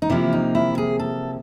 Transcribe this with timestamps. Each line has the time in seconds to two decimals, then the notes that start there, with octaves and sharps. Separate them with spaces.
0.02 D#4
0.10 C3 F3 A#3 E4
0.33 D#4
0.55 E4
0.78 G#4
0.99 A4